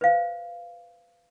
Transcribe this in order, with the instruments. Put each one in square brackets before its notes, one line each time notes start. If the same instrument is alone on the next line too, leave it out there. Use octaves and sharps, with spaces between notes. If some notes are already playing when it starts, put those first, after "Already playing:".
[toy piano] B4 C5 F5